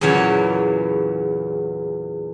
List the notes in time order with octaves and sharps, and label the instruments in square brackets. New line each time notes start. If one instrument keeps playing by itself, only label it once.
[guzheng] E2 A#2 C#3 E3 F#3 C#5